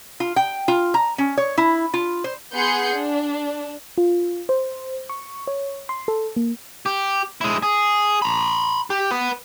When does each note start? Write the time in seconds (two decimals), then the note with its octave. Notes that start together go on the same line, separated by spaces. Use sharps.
0.20 F4
0.36 G5
0.68 F4
0.94 A#5
1.18 C#4
1.37 C#5
1.58 E4
1.94 F4
2.24 C5
2.55 B3 G#4 F#5 C6 G6 C#7
2.96 D4
3.98 F4
4.49 C5
5.09 C#6
5.47 C#5
5.89 C6
6.08 A4
6.37 A#3
6.86 G4
7.41 G#3 E4
7.63 G#4
8.22 A#5 B5
8.90 G4
9.11 B4 F#5